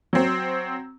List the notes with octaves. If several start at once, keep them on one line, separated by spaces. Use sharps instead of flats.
F#3 C4